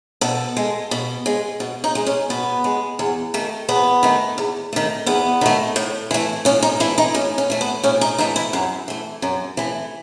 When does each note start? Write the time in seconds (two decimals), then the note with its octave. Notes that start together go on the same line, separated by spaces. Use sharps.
0.21 B2 A4
0.57 G#3
0.91 B2
1.26 G#3
1.60 B2
1.84 D#4
1.95 G#3
2.06 C#4
2.30 B2 B3
2.64 G#3
2.99 E2
3.34 D#3 A3
3.69 E2 B3
4.03 D#3 A3
4.38 E2
4.73 D#3 A3
5.06 E2 B3
5.41 D#3 A3
5.76 A2
6.11 E3 A3
6.45 A2 C#4
6.63 D#4
6.80 E3 A3 E4
6.98 D#4
7.14 A2 C#4
7.38 C#4
7.50 E3 A3
7.61 B3
7.83 A2 C#4
8.01 D#4
8.18 E3 A3 D#4
8.36 E4
8.53 F#2
8.88 E3 A3
9.22 F#2
9.57 E3 A3